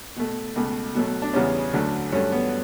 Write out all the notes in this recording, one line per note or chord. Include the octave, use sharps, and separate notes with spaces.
B2 A3
C#2 B2 A3
B2 F#3 A3
D4
E2 C#3 G3 B3 C#4
D2 D3 F#3 A3
G2 F#3 A3 C#4
B3